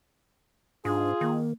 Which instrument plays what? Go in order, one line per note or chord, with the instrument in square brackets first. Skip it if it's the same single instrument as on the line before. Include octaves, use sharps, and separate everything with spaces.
[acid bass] G#2 [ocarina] D4 [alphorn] F4 [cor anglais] G#4
[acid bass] D#3 [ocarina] A#3